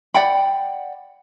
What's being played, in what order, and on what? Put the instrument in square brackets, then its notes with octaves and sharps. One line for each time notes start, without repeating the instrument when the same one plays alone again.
[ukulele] D5 F#5 G5 B5